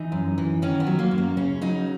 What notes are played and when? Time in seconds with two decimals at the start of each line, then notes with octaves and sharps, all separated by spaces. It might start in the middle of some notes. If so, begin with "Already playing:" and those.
Already playing: E3 D#4
0.12 F#2
0.38 E3
0.62 D#3 C#4
0.80 B3
0.87 F#3
0.99 A#3
1.11 F#2
1.18 A#3
1.37 C#3 C#4
1.61 F#3 D#4